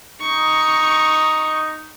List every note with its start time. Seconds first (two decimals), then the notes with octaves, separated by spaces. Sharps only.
0.20 D#4 C#6